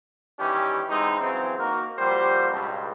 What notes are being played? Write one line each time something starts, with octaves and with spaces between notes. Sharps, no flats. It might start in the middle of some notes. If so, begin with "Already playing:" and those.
D#3 E3 G3 C#4 G4
E3 G#3 B3 C4 D#4
C#3 E3 F#3 C4
A#3 D#4 F#4 A#4
F3 G3 A#3 F#4 G4 C5
C#2 G2 B2